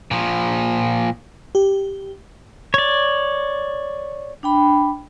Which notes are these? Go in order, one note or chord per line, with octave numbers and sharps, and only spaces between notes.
A#2 F3
G4
C#5 D5
D4 G5 B5